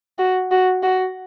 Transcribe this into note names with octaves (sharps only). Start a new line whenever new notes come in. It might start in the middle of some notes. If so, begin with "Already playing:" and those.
F#4
F#4
F#4